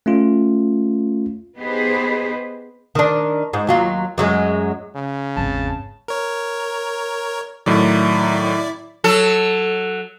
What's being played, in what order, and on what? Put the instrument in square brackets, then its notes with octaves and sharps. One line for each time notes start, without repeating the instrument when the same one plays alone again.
[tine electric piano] A3 C#4 F4
[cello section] B3 D#4 G4 G#4 B4 C5
[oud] D#3 D4
G#2
D#2 F#3 F4
F#2 F#3 G#3
[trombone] C#3
[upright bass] G#1 E2 [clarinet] A5
[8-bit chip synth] A#4 C#5
[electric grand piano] A2 D#3 F#3 [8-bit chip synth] E4 D5
[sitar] F#3 A4